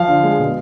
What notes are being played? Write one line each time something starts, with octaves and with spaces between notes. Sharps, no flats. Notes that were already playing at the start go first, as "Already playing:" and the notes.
Already playing: F3 F5
D3
G#3
B2